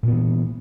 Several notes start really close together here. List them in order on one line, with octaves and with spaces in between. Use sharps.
A#2 B3 E3